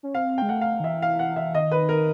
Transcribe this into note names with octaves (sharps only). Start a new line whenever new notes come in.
C#4
C4 F5
G#3 G5
A3 F#5
F5
D#3
E3 E5
F5
F#5
E5
D#3 D#5
B4
A#4